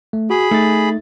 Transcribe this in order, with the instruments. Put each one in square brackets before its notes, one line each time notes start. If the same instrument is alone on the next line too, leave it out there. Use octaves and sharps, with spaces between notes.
[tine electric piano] A3
[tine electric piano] F#4 [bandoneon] G#4 B5
[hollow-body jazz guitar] A3 [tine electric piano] D#4 A6